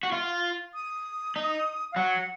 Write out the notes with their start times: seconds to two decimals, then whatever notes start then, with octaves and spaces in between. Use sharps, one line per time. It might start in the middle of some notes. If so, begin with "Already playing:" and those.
0.03 F#4
0.12 F4
0.74 D#6
1.36 D#4
1.92 F5
1.96 F#3 F#5